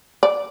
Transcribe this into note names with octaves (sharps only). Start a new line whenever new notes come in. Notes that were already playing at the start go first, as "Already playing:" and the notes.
D5